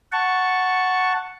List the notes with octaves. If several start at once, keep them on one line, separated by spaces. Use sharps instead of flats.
F#5 A5 C#6